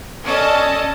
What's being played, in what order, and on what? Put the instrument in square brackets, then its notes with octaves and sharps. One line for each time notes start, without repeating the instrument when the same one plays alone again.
[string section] C#4 A4 D5 D#5 A5